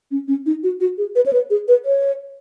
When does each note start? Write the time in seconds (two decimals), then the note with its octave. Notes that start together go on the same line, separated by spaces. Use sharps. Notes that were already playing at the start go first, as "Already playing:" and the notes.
0.11 C#4
0.28 C#4
0.46 D#4
0.63 F#4
0.81 F#4
0.98 G#4
1.15 B4
1.26 C#5
1.33 B4
1.50 G#4
1.68 B4
1.85 C#5